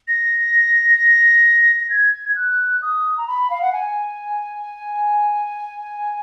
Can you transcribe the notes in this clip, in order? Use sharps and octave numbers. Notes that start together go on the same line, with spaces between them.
A#6
A#6
G#6
G#6
F#6
D#6
A#5
B5
F5
F#5
G#5